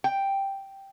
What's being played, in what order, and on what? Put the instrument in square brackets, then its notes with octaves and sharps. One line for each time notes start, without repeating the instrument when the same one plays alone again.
[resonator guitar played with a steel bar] G5